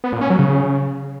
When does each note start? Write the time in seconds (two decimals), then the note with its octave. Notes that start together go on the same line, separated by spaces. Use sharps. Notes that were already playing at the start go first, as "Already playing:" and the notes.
0.04 B3
0.13 A#2
0.21 C#4
0.30 F#3
0.39 C#3